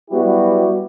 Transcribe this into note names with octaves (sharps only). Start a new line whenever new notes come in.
F#3 G3 B3 E4 F#4 G4